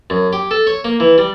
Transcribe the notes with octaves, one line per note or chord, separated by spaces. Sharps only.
F#2
G4
A4
C#5
A#3
E3
G3